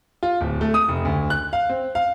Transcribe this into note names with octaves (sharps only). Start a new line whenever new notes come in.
F4
D1
A3
D#6
F1
D2
F#6
F5
C4
F5